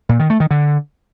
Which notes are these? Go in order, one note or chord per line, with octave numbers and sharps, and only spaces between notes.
A#2
D#3
A3
D#3
D3